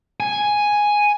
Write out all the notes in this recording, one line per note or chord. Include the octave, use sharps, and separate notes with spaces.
G#5